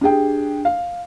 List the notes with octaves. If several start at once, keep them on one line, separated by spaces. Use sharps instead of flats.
D4 G4 G#4 G5
F5